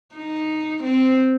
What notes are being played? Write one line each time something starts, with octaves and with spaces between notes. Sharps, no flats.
D#4
C4